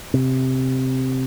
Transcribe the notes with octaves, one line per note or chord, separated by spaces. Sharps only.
C3